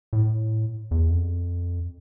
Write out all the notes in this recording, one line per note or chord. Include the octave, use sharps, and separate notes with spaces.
A2
E2
F2